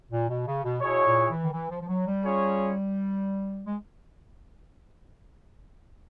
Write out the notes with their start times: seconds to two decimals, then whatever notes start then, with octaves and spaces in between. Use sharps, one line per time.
0.11 A#2
0.29 B2
0.47 C#3
0.64 B2
0.82 B2 E4 G#4 C#5
1.06 A#2
1.30 E3
1.43 D#3
1.53 E3
1.70 F3
1.81 F3
1.88 F#3
2.06 G3
2.24 C#4 F4 G#4 C#5
3.67 G#3